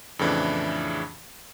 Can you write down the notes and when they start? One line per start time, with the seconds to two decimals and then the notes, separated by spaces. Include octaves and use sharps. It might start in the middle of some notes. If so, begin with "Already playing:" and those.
0.19 F2 A2 C#3 E3 D4 E4